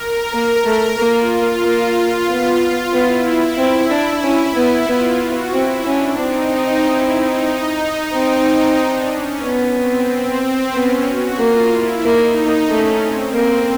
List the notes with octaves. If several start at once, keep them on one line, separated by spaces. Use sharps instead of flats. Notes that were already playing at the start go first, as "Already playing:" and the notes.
Already playing: A#4
A#3
A3
A#3 F4
A#3
B3
B3 E4
C4
D4
C#4
B3
B3 F4
F#4
C4 E4
C#4 D4
C4 D#4
E4
D#4
C4
D4
C#4
B3
C4
C4
B3 C#4
F#4
A#3 F4
E4
A#3 D#4
A3 C#4
C4
A#3 C4